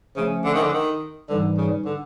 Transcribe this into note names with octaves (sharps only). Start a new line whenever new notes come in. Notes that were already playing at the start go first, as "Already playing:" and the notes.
C#3 F3 A3 C#4
D3
D#3
D3
D#3
G#2 D3 E3 G3
C#3
D3